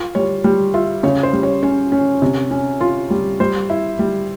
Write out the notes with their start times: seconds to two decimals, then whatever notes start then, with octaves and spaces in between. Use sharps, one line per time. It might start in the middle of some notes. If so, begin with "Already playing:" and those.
Already playing: F4
0.15 G3 C#5
0.44 G3
0.74 F4 E5
1.03 C#3 C#5
1.23 C5
1.33 G3
1.43 C#5
1.63 C#4 C#5
1.92 C#4
2.22 C3
2.51 C#4
2.81 F4
3.10 G3
3.40 G3 C5
3.70 E4
3.99 G3